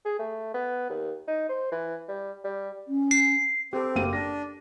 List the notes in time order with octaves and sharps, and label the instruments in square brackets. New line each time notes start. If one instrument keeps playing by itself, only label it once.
[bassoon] G#4
A3
B3
D#2
D#4
C5
E3
G3
G3
[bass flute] C#4
[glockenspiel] C7
[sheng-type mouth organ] C4 [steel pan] G4 A4
[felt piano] F#1 A#3 D#7 [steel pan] G4 A#4
[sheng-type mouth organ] D4 [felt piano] A#6